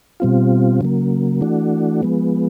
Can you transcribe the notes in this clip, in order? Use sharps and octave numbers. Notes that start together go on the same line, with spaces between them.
B2 G3 C4 F4
C#3 F#3 A#3
E3 A3 D4 F#4
F3 G#3 B3